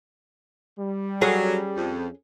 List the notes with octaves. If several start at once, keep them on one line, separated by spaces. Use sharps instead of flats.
G3
F#3 C#4 G#4
F2